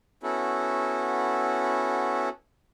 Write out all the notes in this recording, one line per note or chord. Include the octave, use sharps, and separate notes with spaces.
B3 C#4 E4 F#4 A4